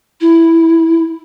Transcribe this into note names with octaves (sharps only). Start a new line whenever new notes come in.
E4